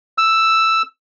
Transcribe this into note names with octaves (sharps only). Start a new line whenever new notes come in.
E6